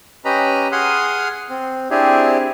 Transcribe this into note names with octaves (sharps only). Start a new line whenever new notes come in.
C#4 G4 B4 D#5 A#5 B5
G#4 F#5 C6 D#6 F6
C4
C4 D4 E4 G4 G#4